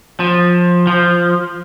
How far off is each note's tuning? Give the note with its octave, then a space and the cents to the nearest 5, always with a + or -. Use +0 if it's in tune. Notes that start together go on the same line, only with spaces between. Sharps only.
F3 +15
F3 -5